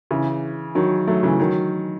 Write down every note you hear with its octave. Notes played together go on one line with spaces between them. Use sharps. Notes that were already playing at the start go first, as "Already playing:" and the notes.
C#3 E3
D#3 F#3
F#3 A3
C#3 E3
D#3 F#3